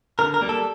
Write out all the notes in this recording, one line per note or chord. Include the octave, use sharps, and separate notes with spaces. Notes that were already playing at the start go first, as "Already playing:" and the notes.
D3 A#4
A#4
G3 A#3
A4